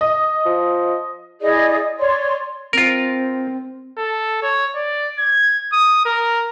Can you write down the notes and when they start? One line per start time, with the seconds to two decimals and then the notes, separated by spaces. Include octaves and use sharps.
0.01 D#5
0.46 F3
1.42 E4 G#4 D5 D#5
1.99 C#5 D5 C6
2.73 C4 F4 A#4
3.98 A4
4.43 C#5
4.76 D5
5.19 G#6
5.73 D#6
6.05 A#4